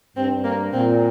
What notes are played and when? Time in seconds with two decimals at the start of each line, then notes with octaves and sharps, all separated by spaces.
0.16 G2 C4
0.44 A#3
0.72 A#2 C4